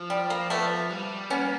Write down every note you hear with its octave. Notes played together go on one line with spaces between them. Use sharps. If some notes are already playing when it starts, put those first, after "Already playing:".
Already playing: F3
G3
A#3
F3 A3 B3
G3
A#3 B3 C#4